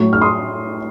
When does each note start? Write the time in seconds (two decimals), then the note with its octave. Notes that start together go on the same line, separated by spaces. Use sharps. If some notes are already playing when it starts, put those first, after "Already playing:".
Already playing: A2 F#3 C#6
0.13 F6
0.21 C6 D#6